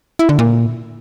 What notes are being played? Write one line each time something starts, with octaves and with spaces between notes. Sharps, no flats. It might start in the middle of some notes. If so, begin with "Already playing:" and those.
E4
D3
A#2